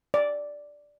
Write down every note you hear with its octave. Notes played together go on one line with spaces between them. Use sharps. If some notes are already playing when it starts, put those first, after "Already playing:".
D5